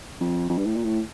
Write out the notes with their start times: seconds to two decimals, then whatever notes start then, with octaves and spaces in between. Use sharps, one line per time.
0.20 F2
0.49 F2
0.58 G2
0.66 A2
0.76 A#2
0.84 A2